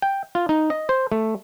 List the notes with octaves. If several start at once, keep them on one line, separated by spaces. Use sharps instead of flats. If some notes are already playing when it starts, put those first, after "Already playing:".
G5
F4
D#4
D#5
C5
A3